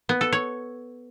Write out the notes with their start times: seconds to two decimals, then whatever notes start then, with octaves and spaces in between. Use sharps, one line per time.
0.09 B3
0.21 A4
0.32 C#5